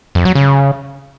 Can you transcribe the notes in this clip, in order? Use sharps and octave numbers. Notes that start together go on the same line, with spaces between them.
F2
F#3
C#3